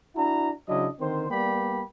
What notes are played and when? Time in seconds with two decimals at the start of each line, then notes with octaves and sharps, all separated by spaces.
0.16 D4 E4 F#4 A#5
0.68 C#3 F#3 D4 E4 D#5
0.99 D3 D#3 C4 C5
1.30 G3 A#3 B3 D5 G5 B5